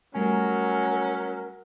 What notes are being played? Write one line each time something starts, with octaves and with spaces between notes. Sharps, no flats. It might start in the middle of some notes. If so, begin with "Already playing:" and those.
F#3 G3 A3 C#4 A#4 G#5